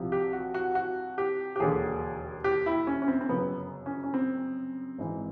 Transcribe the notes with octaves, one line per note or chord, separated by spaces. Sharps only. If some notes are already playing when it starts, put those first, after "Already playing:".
Already playing: C2 C3 F3
G4
F#4
F#4
F#4
G4
G4
E1 D#2 D3 G#4
G4
E4
C#4
C#4
C4
C4
G1 F#2 C#3 B3
C#4
C#4
C4
G#1 G#2 E3